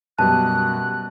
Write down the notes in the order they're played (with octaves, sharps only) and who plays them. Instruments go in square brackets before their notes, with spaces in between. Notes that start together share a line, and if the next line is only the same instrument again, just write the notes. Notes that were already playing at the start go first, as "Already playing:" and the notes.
[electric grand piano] F#2 B2 G3 [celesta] A5 [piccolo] F#6